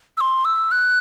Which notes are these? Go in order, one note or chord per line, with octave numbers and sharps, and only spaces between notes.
E6
C6
E6
F#6